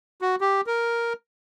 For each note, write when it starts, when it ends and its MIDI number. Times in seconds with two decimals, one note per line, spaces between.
0.22 0.36 66
0.41 0.61 67
0.67 1.13 70